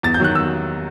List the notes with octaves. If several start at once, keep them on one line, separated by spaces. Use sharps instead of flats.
E2 A6
G6
D#3 F#3 F#6
E6